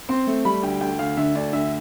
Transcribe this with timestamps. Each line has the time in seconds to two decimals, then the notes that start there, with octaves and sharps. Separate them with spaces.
0.09 C4 C6
0.27 A3
0.45 G3 B5
0.63 D2 G5
0.81 D2 G5
0.99 D2 F5
1.17 D3 E5
1.35 D2 D5
1.53 D2 E5